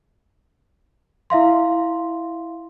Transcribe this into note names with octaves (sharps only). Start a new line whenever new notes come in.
E4 E5 F5 C6